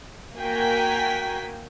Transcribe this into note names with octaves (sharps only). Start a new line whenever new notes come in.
A#3 F#4 A#4 G5 G#5 B6